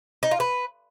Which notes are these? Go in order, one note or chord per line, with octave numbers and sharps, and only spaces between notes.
D#4
F4
B4